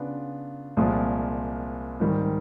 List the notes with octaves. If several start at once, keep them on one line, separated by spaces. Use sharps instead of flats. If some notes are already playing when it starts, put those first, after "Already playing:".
Already playing: C#3 B3 D4 F4
C2 A#2 F3 G#3
G#2 D#3 G3